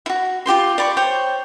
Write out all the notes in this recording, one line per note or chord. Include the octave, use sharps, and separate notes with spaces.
E4 F#4
F4 G4 G5 C6
D5 B5 C#6
C5 C#5 G5